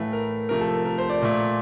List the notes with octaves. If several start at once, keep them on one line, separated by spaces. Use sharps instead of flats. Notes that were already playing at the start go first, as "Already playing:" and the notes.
Already playing: A2 E3 A3 F5
A#4
C3 F3 A3 A#4
A4
A#4
A#4
C5
D5
A#2 A3 D5